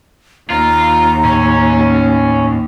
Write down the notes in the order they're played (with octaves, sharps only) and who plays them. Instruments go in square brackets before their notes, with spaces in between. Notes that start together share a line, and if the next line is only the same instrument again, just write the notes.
[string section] D#2 [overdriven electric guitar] F4 [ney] A#5
[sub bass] A2 [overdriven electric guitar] C#4